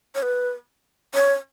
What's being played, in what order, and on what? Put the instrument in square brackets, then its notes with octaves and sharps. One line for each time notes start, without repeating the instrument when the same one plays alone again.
[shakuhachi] C#5
B4
C#5